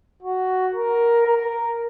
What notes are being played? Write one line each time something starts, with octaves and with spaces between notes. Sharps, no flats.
F#4
A#4
A#4